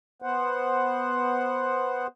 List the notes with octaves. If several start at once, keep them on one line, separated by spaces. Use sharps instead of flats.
B3 C5 F#5